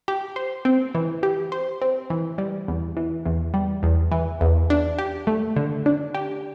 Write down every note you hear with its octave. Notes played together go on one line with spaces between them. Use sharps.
G4
C5
C4
E3
G4
C5
C4
E3
G3
E2
E3
E2
G3
E2
E3
E2
D4
G4
A3
D3
D4
G4